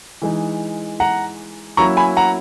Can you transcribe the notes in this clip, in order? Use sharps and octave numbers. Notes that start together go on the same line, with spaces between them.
E3 G#3 D#4
F#5 A#5
F#3 A#3 C#4 E4 A#5 C#6
G#5 B5
F#5 A#5